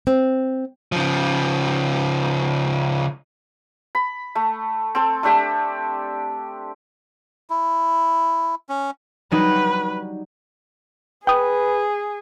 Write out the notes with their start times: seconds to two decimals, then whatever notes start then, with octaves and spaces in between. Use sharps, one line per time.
0.07 C4
0.92 C#3 F3
3.95 B5
4.35 A3
4.95 C4 A4
5.23 A3 D4 G4 E5
7.50 E4
8.69 C#4
9.31 F#3 G3 D#4 B4
11.27 G#4 B4 G5 D#6